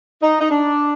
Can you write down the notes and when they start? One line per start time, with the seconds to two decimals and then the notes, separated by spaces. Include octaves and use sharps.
0.22 D#4
0.41 D#4
0.51 D4